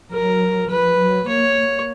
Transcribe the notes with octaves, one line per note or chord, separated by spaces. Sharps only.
F#3 A#4
F3 B4
F#3
A#3 C#5
A#3